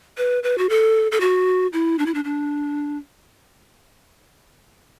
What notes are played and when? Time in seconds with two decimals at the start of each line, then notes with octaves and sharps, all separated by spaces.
0.17 B4
0.43 B4
0.58 F#4
0.70 A4
1.12 A4
1.21 F#4
1.73 E4
1.99 D4
2.06 E4
2.14 D4
2.25 D4